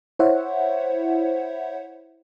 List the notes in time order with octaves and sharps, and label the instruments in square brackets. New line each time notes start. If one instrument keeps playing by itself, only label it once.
[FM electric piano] E4 C5 C#5 E5 F#5